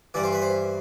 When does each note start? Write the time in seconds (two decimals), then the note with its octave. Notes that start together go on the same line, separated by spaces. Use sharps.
0.14 G2 E3 G3 D5
0.24 C5
0.33 B4
0.42 C5